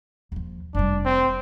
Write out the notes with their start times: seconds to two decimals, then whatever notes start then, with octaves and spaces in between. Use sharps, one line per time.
0.32 D#2 F3
0.75 F1 G3 D4
1.05 C4